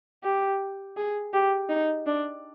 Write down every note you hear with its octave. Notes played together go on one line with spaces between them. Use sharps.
G4
G#4
G4
D#4
D4